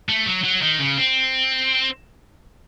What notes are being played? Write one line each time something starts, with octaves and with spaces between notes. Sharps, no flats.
A3
F#3
F#3
D#3
C#3
C4